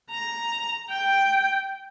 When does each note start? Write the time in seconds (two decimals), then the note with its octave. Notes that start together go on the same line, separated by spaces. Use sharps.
0.11 A#5
0.90 G5